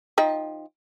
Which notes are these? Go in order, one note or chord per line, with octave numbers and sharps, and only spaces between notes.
F3 D#4 G5